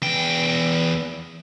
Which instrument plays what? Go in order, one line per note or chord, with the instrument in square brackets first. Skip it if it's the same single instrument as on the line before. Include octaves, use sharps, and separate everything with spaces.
[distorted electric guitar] E2 G5